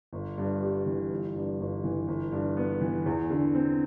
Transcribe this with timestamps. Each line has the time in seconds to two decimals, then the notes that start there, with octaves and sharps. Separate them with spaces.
0.13 G1
0.38 G2
0.62 G3
0.86 E3
1.11 G1
1.35 G2
1.60 G1
1.84 E3
2.08 G1
2.32 G2
2.57 B3
2.81 E3
3.06 E2
3.30 D3
3.55 C4